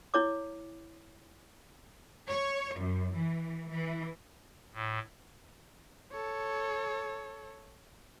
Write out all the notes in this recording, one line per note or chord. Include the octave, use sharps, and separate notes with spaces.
E4 C#5 D6
C#5
F#2
E3
E3
A2
A4 C#5